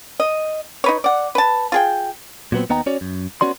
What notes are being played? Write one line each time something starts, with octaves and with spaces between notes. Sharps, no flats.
D#5
D#4 B4 C#5
D5 F#5
B4 A5
F4 G#4 G5
A#2 F#3 B3 C4
D#2 B3 D#4 G5 A#5
C#4 F#4 C#5 D5
F#2
B3 C#4 F#4 D5 C6